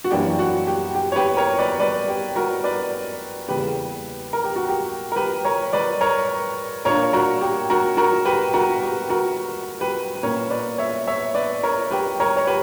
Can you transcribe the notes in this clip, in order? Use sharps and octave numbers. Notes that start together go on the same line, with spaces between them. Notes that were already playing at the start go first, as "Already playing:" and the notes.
F#4
F#2 E3 A#3 D4 G4
F#4
G4
G4
C#5
G4 B4
A#4 C#5
B4 D5
B4 D5
G4
F#4 A#4
B4 D5
E2 C#3 G3 A#3 G4 B4
A#4
G4
F#4
G4
A#4
G4 B4
A#4 C#5
B4 D5
A#4 C#5
A#2 A#3 D4 A#4 C#5
F#4 A#4
G4
F#4 A#4
F#4 A#4
G4 B4
F#4 A#4
G4
F#4 A#4
G4 B4
B4
A#2 A#3 C#4 A#4 C#5
B4 D5
C#5 E5
C#5 E5
B4 D5
A#4 C#5
G4 B4
A#4 C#5
C#5
G4 B4